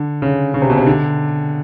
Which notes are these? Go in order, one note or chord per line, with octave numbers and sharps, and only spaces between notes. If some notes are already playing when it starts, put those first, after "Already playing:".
Already playing: D3
C#3
C#3
C3
B2
C3
D3